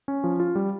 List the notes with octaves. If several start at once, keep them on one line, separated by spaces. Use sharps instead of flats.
C#4
F3
F4
G3